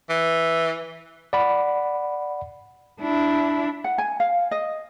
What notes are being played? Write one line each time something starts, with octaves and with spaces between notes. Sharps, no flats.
E3
D5 F#5 B5
D4 E4
F#5
G#5
F5
D#5